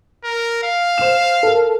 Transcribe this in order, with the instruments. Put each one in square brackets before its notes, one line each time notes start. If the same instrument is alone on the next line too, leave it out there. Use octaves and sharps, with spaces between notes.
[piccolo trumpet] A#4
F5
[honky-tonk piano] C5 E7
A4 A#4